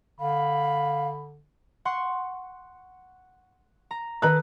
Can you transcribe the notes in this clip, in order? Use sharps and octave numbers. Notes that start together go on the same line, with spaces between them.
D3 F5 B5
F#5 C6 C#6
A#5
D#3 A4 B4 A#5 F#6